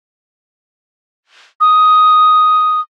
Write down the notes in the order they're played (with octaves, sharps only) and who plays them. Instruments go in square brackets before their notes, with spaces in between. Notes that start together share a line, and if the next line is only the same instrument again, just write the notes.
[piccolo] D#6